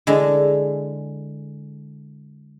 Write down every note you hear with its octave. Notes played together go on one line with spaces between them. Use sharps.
D3 G#3 E4 G#4